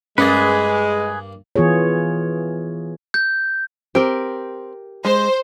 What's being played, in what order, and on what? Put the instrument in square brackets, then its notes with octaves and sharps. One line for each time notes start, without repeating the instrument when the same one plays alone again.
[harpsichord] G2 A#3 [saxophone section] G#3 [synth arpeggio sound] C#4 A6 [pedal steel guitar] G#4 B4
[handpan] E3 B3 F4 G#4 C#5
[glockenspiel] G6
[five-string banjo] C4 [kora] G4 A#4
[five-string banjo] G#3 [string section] C5